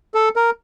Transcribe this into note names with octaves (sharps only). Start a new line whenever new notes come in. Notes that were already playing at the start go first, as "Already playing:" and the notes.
A4
A#4